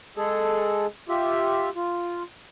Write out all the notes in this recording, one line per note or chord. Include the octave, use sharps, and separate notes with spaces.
G#3 G#4 A4
F4 G4 E5
F4